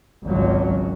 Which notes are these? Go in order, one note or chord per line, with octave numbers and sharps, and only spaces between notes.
G#1 C#2 F#3